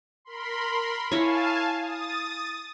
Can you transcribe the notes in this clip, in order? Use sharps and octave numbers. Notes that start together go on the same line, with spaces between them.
A#4 B5 C6
E4 C#5 F5 G#5 A5
D#6 A6